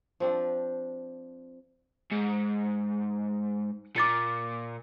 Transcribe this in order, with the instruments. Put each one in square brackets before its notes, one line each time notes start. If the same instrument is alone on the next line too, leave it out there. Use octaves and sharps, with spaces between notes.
[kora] F3 C4 D4
[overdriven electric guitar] G#2
[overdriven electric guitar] A#2 [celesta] D6 A6 C#7